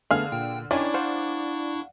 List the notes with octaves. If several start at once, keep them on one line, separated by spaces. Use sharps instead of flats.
D3 A3 B3 G#4 F5 F6
A#2 G5
D#3 C#4 D4 E4 D5 G#5 C#6
C5 F5 F#5